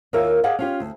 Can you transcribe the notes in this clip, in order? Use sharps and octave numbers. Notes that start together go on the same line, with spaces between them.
D#2 A#3 F4 A#4 C#5 E5
G4 G#4 D#5 F5 F#5 G#5
C#4 F4 G4
D2